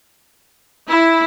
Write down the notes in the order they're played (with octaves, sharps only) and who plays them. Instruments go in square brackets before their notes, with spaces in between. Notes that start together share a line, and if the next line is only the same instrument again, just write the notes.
[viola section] E4